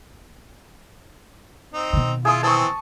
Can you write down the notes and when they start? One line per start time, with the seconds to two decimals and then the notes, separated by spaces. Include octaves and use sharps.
1.74 C4 D#4
1.93 B2 D#3
2.25 E4 F4 G#4 D#6
2.43 E3 C4 A5 C#6